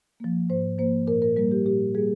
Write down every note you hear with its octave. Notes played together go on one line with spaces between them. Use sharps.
F3 A#3
G#2 C5
F3 A#3 C5
A#2 A#4
A#4
G3 A#3 A#4
G4
A#2 G4
G3 A#3 G#4